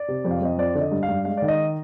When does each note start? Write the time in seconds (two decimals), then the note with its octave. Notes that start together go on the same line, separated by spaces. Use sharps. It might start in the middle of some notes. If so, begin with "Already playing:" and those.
Already playing: D5
0.08 C3
0.25 F2
0.31 F5
0.42 F2 D#5
0.58 F3 D5
0.75 D3 D5
0.81 D#5
0.92 G2
1.03 F5
1.09 G2
1.25 G#3 F5
1.37 D#3 D5
1.48 D#5